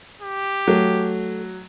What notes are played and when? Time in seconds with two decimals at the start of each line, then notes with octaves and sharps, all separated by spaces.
0.22 G4
0.67 F#3 A3